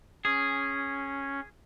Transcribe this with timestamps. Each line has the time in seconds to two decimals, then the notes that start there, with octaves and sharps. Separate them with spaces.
0.25 C#4 G#4